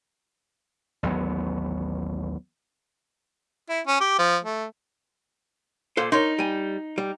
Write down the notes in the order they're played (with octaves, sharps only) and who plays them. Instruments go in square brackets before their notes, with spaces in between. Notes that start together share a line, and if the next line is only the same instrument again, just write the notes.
[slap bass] A1 D#2 F#3 B3
[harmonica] E4
C#4
G4
F3
A3
[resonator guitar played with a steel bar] A#2 [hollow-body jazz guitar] A4 C5 F5
[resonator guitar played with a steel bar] D#4 [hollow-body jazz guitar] A#4 C#5 C6
[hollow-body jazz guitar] G3 G#5
G3